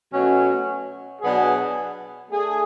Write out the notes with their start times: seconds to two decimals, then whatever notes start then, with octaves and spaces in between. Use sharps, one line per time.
0.12 B2 F#3 A3 C#4 F#4
1.21 B2 F#3 B3 D4 G#4
2.30 A3 D4 G#4